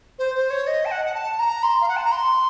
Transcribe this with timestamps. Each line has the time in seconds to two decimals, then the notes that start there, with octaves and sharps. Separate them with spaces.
0.19 C5
0.35 C5
0.50 C#5
0.67 D#5
0.85 A5
0.91 F#5
1.05 F#5
1.14 A5
1.39 A#5
1.63 C6
1.81 F5
1.89 F#5
1.97 A5
2.04 A#5
2.12 C6